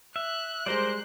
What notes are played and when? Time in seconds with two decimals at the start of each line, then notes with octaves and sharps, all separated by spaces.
0.16 E5 F#6
0.66 G3 G#3 A#4 C5 D5